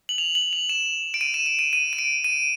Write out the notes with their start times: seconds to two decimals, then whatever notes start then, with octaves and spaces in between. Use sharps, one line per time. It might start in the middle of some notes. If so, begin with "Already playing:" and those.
0.09 F#7
0.18 F7
0.35 F#7
0.53 F7
0.69 E7
1.14 D7
1.21 D#7
1.34 E7
1.46 E7
1.59 D#7
1.73 D#7
1.93 D#7
1.99 D7
2.24 D#7